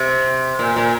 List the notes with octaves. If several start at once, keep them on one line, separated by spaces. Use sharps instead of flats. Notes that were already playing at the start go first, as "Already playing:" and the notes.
Already playing: C3
A#2
A#2